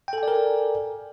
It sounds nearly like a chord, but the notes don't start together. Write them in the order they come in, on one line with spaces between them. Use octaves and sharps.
G5 A4 G#5 D5 A#4